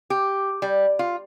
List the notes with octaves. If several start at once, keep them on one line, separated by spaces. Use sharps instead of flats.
G4
G3
F4